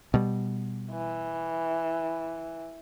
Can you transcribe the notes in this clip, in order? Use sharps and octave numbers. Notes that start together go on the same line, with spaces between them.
B2 G3
E3